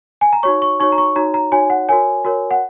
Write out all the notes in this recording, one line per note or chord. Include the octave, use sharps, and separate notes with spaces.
G#5
A#5
D#4 F#4 C#5 C#6
C#6
D#4 F#4 C#5 C#6
A#5
C#6
D#4 F#4 C#5 A#5
A#5
D#4 F#4 C#5 G#5
F#5
F#4 A#4 C#5 G#5
F#4 A#4 C#5
F#5